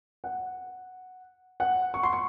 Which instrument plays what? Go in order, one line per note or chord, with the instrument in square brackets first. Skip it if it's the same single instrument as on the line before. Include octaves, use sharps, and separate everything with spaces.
[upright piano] F#5
F#5
C#6
C6
C#6